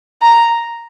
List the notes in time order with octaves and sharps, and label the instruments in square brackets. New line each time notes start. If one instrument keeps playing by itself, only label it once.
[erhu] A#5